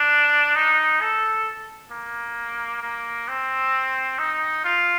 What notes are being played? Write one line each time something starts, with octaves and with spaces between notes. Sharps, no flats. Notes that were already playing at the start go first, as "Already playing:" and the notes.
Already playing: D4
D#4
A4
A#3
A#3
C4
D#4
F4